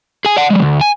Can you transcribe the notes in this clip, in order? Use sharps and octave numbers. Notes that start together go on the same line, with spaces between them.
G#4 G#5
D5 F#5
F#3 G#3
D2
G#5